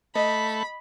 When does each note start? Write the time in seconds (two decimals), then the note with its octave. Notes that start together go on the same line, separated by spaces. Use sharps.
0.15 A3 D#5 B5